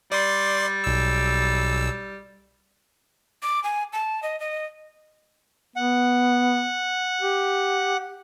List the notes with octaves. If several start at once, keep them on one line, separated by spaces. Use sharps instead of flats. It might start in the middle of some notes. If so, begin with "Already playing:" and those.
G3 D5 C6
B1 E6
D6
G#5
A5
D#5
D#5
B3 F#5
G4